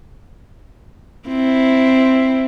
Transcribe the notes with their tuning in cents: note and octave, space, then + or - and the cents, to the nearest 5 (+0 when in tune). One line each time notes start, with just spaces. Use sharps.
C4 +0 E4 +0